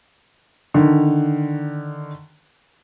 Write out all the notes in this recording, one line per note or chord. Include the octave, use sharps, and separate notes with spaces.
D3 D#3